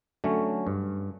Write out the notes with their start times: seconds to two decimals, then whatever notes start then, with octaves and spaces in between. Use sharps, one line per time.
0.24 D3 F#3 A3 C#4
0.67 G2